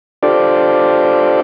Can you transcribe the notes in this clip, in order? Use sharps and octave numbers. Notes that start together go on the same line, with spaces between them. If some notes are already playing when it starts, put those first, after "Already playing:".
D4 F4 G4 A4 C5 D5